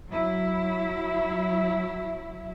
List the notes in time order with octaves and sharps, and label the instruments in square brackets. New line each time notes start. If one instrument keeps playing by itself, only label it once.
[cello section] F#3 E4